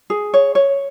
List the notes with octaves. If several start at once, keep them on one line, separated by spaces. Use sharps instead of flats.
G#4
C#5
C#5